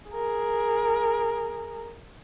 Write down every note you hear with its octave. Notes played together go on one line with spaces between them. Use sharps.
G#4 A#4